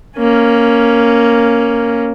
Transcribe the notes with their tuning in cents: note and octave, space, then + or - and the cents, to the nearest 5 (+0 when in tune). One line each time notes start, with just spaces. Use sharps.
A#3 +0 C#4 +0